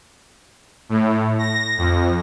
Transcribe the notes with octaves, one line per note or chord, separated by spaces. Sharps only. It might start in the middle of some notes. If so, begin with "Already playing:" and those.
A2
A#6
F2